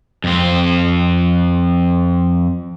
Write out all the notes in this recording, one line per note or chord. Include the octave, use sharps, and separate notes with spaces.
F2 C4